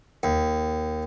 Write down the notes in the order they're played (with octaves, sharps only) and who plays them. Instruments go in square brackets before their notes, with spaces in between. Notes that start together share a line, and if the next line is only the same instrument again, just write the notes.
[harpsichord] D#2